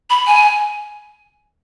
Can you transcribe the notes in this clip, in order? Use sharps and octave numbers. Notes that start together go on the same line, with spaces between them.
B5
G#5